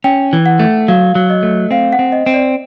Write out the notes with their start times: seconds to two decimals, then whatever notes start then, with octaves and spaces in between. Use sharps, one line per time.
0.04 C#4 G5
0.33 E3
0.46 F#5
0.59 A3
0.88 F#3 F5
1.15 F#3
1.30 D#5
1.43 A3
1.71 C4 F5
1.93 F#5
1.99 C4
2.12 D#5
2.26 C4
2.34 D5